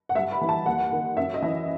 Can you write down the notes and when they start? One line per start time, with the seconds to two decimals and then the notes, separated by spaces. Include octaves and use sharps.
0.09 F#5
0.15 G2 E5
0.32 B5
0.41 E3
0.49 A5
0.66 D#2 F#5
0.92 D#3
1.17 F#2 E5
1.34 D#5
1.42 E3 E5